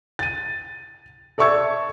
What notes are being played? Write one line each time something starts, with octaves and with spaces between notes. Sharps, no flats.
A6 D#7
A4 D5 E5 C#6 E6 G#6